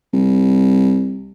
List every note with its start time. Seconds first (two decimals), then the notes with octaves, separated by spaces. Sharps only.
0.13 C2